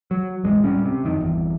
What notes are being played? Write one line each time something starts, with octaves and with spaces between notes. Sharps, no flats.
F#3
E1 A1 G#3
D1 G3 C#4
C3
F2 D#3
G1 E2